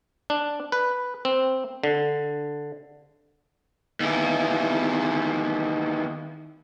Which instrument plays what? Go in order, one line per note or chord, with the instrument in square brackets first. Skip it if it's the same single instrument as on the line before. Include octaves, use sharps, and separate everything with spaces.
[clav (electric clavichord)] D4
B4
C4
D3
[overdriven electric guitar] D#2 E3